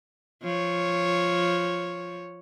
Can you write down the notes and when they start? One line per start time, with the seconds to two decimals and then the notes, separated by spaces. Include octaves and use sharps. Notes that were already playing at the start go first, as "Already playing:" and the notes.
0.43 F3 C#5